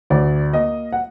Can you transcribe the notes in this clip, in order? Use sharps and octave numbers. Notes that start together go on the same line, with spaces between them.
D2 D5
A#3 D#5
F#5